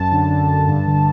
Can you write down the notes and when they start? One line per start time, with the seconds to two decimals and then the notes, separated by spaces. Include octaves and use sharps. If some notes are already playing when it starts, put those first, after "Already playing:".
Already playing: F#2 A5
0.12 D3
0.30 D3
0.49 D3
0.68 G2
0.87 D3